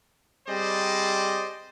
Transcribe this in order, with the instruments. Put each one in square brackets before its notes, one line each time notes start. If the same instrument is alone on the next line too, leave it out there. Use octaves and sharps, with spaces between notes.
[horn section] G3 C4 G#4 C5 D5 D#5